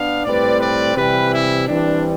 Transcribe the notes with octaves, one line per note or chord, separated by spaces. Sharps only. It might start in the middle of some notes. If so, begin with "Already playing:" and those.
Already playing: B3 D4 F5
A2 G3 C4 B4 D5
B4 D5
C3 E3 G3 G4 B4
E4
E3 G3 C4 D4